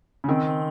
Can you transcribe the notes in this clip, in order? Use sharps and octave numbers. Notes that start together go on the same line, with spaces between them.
C#3
D#3 C4